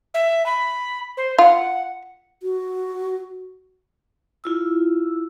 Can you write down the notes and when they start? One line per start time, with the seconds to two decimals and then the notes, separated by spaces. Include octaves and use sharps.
0.14 E5
0.46 B5
1.17 C5
1.38 F4 F#5
2.43 F#4
4.44 E4 F4 E6